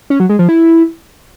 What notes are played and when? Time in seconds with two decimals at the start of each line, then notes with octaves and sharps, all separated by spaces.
0.10 C#4
0.20 F#3
0.29 G#3
0.39 F3
0.49 E4